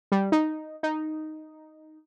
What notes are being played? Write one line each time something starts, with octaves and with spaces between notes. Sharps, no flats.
G3
D#4
D#4